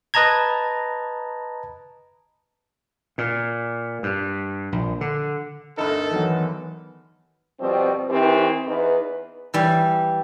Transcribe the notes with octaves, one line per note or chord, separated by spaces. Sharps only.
B4 D#5 A5 A#5 G#6
A#2
G2
A#1
D3
G1 D2 D#4 A4 A#4
D#3 E3 F#3 B3
B2 F3 G3 C4
D#3 E3 C4 G4 B4
E2 D#4 B4
E3 G3